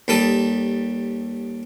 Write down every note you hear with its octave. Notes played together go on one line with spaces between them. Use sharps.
D#2 G3 A4 D#6